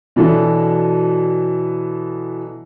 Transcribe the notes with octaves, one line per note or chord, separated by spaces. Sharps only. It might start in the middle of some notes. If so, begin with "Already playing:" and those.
B2 E3 F#3 D4 A4